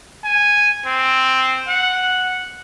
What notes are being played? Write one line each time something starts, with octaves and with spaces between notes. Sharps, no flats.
G#5
C4
F#5